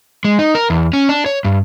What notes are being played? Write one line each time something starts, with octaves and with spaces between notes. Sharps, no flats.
G#3
D#4
A#4
E2
C#4
D4
C#5
G2